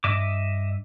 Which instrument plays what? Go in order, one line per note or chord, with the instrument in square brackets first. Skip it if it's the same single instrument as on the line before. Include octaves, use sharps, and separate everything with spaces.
[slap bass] G2 C4 D4 [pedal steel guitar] D#5 E5 D6